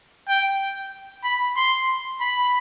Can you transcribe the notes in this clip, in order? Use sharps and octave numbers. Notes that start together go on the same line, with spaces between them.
G5
B5
C6
B5